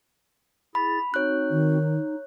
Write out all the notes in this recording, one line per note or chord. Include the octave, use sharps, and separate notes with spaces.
E4 G#4 B5 A6
C4 D#4 F#4 C#5 F#6
D#3
D#4